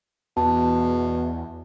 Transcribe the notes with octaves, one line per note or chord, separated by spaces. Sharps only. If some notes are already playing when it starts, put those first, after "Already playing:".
E2 B2 A5